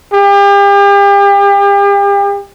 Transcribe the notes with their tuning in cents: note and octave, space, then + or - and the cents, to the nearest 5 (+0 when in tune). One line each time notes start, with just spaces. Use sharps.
G4 +40